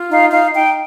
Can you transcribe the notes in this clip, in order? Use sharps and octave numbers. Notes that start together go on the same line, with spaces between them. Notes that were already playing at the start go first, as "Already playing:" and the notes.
Already playing: F4
D#4 F5
D#4 F5
D#4 G5